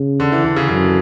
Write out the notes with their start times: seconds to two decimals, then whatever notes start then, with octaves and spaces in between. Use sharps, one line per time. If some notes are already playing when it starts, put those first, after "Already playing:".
Already playing: C#3
0.20 D3
0.32 E3
0.44 D3
0.56 C#3
0.68 F#2 C#3